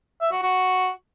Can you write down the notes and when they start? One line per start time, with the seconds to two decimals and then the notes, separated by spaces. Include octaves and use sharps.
0.21 E5
0.32 F#4
0.43 F#4